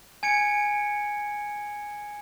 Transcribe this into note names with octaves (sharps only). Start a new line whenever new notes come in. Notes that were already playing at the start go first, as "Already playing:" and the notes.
G#5 G#6 C#7 D7